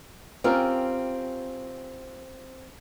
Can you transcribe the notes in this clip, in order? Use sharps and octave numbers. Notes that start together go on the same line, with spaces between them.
C4 C#4 F4 G4 A#4